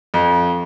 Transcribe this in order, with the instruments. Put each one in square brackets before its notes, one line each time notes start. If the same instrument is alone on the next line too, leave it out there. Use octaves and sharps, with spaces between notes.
[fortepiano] F2